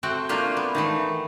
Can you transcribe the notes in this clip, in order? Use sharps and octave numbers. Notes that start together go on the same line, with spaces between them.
A3 C4 F#4 F#5 G5
A3 A#3 D4 F4 G4
B3
D#3 E3 A3